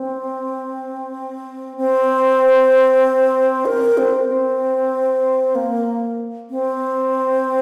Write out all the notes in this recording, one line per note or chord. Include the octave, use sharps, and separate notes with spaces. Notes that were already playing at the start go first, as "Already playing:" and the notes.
Already playing: C4
C4
A#4
C4
C4
A#3
C4